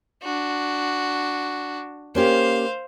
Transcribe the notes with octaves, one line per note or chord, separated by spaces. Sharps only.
D4 F#4
A#3 C#4 G4 C5 F5